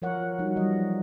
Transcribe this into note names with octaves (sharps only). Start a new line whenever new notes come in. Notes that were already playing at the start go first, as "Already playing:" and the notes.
F3 A#4 C#5 F#5
F#3 G3 D#4
E3 F3 G3 D#5